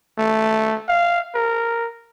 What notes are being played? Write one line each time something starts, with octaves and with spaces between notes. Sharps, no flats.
A3
F5
A#4